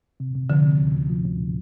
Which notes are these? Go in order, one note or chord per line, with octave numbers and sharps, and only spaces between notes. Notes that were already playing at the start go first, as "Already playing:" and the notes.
C3
C3
D3 F3
C3
D2
D2
F3
D2